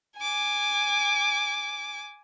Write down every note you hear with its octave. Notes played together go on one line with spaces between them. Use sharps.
G#5 D6